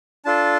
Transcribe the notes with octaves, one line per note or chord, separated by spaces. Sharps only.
D4 F4 A4 A5